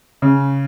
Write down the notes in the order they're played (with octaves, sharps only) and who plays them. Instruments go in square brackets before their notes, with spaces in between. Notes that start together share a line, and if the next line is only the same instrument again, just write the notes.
[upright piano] C#3